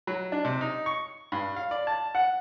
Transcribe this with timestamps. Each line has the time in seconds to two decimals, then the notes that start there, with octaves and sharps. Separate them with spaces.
0.07 F#3
0.32 D4
0.45 C3
0.61 D#4
0.86 C#6
1.32 G2
1.56 F5
1.71 D5
1.87 A5
2.15 F#5